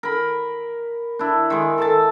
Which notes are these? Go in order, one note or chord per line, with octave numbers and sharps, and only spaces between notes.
A#4 B5
D4 E4
D#3 G#3
A4 E5 A5